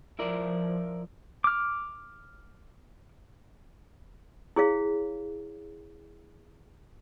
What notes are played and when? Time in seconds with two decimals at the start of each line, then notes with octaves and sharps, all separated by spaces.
0.19 F3 E4 A#4 D5
1.44 D6 F6
4.56 E4 G#4 C#5 F5